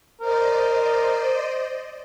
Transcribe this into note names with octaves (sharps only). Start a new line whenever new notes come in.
A#4 C5 D5 D#5